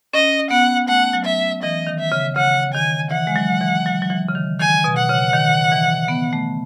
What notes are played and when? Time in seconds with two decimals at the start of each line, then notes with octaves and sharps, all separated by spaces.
0.14 C#4 D#5
0.51 B3 F#5
0.88 A3 F#5
1.13 F#3
1.26 E5
1.63 E3 D#5
1.87 D#3
1.99 E5
2.12 C#3
2.36 C#3 F#5
2.74 D#3 G#5
3.11 E3 F#5
3.27 G#3
3.36 F#3
3.61 E3
3.86 F#3
4.02 F#3
4.10 E3
4.28 C#3
4.35 D#3
4.60 D#3 G#5
4.84 B2
4.97 F#5
5.09 C#3
5.34 D#3
5.72 E3
6.08 B3
6.33 A3